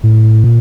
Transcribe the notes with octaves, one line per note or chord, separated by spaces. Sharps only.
A2
A#2